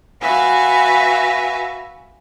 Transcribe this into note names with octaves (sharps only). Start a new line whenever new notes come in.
F#4 B4 E5 F5 G#5